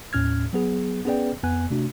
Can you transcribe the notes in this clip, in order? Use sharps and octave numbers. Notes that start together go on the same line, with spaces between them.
D#2 A2 C#4 F6 G#6
F#3 B3 G#4
B3 C#4 G#4 B4 D5 G5
F2 B3 G#5 F#6
C3 A3 D4 F#4